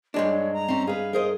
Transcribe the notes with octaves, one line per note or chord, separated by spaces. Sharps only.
G2 G#3 D4 C#5
A#5
C4 C#4
G#4 B4 F5
G#4 A#4 C5 D#5